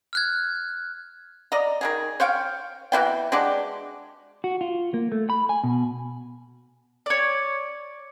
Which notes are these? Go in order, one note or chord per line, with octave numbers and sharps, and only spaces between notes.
F6 F#6 G#6
D5 D#5 A#5
D#3 G3 G#4
C5 C#5 F5 G5
B2 E3 E4 G5
G#3 D4 F#4 G4
F#4
F4
A#3
A3
B5
G#5
B2
C#5 D5